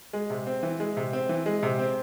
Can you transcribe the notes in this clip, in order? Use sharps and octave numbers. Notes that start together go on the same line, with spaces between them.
G#3
C3
C4
E3
G#3
C3
C4
E3
G#3
C3
C4